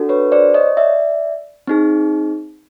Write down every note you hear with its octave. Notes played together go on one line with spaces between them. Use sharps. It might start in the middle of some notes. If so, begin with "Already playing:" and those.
Already playing: D4 F#4 A4
B4 C#5
C5 D5
C#5 D#5
D5 E5
C4 D#4 G#4